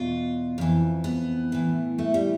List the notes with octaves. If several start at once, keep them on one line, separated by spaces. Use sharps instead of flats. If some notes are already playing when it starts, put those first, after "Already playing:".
Already playing: E2 B2 F4
F2 E3
B3
A2 E3
A3
G3